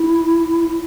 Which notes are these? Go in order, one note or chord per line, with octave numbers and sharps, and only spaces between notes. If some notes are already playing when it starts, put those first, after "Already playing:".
Already playing: E4